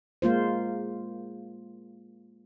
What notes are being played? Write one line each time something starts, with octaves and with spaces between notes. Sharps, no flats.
G#3 A#3 F4 C5